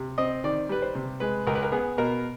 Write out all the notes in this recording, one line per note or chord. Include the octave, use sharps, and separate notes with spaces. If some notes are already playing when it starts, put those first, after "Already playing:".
Already playing: C3
C4 D#5
D#3 D5
G3 B4
C5
C3
G#3 B4
C#2 A#4
B4
A#4
B3 G#4
B2 A#4